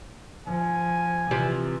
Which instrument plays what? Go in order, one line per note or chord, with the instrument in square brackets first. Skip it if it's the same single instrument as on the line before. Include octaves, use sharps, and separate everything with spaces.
[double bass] F3 [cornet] G#5
[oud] C3 F3 G4 [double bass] E3